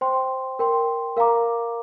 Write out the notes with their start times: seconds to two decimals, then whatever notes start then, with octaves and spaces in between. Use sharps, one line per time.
0.01 C5 G5 C6
0.59 A#4 G5 C6
1.17 A#4 F5 A#5 D6